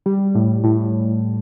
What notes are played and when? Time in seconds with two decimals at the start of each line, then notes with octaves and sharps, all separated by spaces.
0.06 G3
0.35 A2
0.64 A2